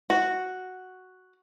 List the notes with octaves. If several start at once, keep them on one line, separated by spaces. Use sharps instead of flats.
F#4